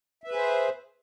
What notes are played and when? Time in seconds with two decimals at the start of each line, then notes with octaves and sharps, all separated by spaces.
0.24 E5
0.28 B4
0.31 G#4
0.35 C5